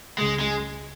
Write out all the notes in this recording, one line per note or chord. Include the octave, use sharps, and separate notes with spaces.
C#2 C#3 G#3
G#3